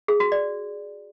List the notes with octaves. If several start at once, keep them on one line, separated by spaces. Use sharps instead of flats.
G#4
F#4
D5